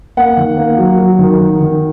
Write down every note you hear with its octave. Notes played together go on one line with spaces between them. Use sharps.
A#3 F#5
D#3
A#3
F#3
F#3
D#3
D#3
D#3